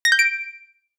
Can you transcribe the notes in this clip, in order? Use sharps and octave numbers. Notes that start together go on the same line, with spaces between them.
A#6
G6
D7